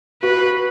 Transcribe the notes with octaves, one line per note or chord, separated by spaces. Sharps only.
F#4 B4